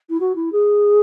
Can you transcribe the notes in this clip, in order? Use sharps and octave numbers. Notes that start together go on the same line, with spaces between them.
E4
F#4
E4
G#4